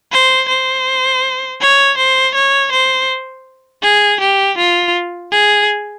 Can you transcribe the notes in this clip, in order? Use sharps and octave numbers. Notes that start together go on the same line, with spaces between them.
C5
C5
C#5
C5
C#5
C5
G#4
G4
F4
G#4